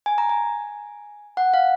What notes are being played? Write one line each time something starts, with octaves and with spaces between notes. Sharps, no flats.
G#5
A#5
G#5
F#5
F5